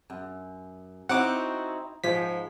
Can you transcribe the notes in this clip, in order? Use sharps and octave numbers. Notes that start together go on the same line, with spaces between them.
F#2
C4 D#4 E4 F#4 F#5 D6
G#2 F3 G#3 B6